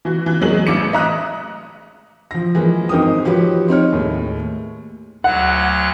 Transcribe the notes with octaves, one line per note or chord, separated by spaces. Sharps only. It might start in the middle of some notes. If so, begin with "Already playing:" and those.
E3 F#4
E3
E2 F#3 G#3 A#3 F#7
A1 D6 C#7 E7
D#5 E5 A#5 D#6 F#6
F3 A#6
E3 F3 G#3 A#3
G#1 D#4 A#4 G5 D#6
F3 F#4 G4 B4 C#5
C4 D#4 C#5 F6
D#2 A2 G#3
D2 F#3 F#5 F#6